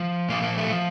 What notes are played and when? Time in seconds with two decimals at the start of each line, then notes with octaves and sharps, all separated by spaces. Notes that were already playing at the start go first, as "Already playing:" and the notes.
Already playing: F3
0.29 A#2 F3 A#3
0.42 A#3
0.57 A3
0.71 F3